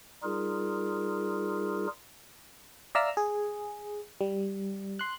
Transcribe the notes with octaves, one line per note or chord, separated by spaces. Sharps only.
G3 D#4 F4 G#4 A#4
D5 E5 F5 A#5 E6 F6
G#4
G3
C6 F#6